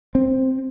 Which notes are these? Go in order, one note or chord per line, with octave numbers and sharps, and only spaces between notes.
C4